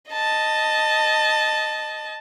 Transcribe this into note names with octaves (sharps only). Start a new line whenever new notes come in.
D#5 A5